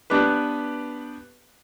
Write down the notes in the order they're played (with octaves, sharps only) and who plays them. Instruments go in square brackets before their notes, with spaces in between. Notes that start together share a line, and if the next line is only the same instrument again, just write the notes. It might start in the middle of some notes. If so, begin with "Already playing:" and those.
[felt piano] B3 D4 G4 B4